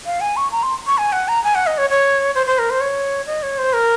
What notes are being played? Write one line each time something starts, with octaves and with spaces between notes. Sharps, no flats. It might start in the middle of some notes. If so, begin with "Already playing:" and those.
F5
G#5
C#6
A#5
C6
C#6
G#5
F#5
A#5
G#5
F#5
D#5
C#5
C#5
C5
C5
A#4
C5
C#5
D#5
C#5
C5
A#4